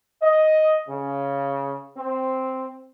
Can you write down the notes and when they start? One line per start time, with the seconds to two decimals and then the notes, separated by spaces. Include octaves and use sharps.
0.22 D#5
0.89 C#3
1.97 C4